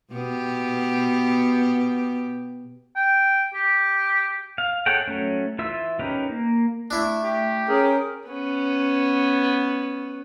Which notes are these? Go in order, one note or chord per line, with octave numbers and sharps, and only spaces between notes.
B2 B3 G4
G5
G4
F5
G#4 A4 C#5 F#5 G5
F#3 A3 C#4
E3 F4 E5 E6
C#4 D#4 G4 A#4 B4
A#3
A3 D4 E4
G4
C#4 G#4 A#4
B3 C#4